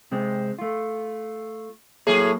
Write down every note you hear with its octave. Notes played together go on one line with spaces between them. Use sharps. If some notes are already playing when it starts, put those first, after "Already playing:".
C3 G#3 C4
A3 F4
A2 F#3 A#3 G#4